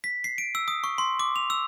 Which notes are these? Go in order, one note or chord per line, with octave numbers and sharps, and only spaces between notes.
B6
C7
D7
E6
D#6
C#6
C6
D6
F7
E6